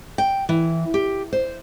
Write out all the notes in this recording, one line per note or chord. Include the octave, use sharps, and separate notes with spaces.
G5
E3
G4
C5